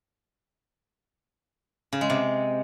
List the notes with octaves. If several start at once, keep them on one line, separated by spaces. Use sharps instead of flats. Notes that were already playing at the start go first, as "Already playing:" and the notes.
C#3
G#3
C3